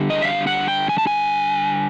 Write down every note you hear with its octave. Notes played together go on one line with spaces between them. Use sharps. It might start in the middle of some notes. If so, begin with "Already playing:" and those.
Already playing: D3 G3
D#5
E5
F5
F#5
G5
G#5
A5
G#5